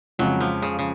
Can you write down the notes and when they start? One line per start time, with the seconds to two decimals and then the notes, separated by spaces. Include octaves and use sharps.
0.19 F2 C#3 F#3 G#3
0.40 F3
0.62 C#3
0.79 C#3